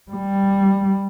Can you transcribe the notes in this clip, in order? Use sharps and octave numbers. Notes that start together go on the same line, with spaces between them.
G3